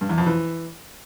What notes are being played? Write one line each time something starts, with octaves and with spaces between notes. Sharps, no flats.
G2
E2
F2
E3